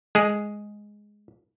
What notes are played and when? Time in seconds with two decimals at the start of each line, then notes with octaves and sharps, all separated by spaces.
0.15 G#3 G#4